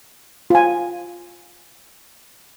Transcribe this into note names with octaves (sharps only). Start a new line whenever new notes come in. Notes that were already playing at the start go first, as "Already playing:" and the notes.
F4 G#5